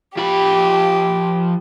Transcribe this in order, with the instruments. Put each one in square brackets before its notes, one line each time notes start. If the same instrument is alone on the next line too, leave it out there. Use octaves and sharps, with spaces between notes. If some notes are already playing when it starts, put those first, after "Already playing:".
[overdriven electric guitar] F3 B5 [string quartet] G4